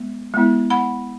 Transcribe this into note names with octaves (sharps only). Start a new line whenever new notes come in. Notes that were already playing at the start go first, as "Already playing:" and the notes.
Already playing: G#3 B3
G#3 B3 E4
F#5 B5